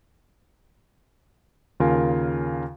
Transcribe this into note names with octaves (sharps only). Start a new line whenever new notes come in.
D#2 C#3 F4 A#4 F5 G#5